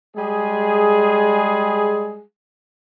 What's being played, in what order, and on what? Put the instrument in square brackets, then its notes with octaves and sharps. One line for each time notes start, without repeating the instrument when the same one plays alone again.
[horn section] G3 G#3 G#4